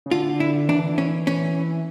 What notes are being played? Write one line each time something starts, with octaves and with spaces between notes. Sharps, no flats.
C#3
D3 F4
E4
E3 D4
C#4
C#4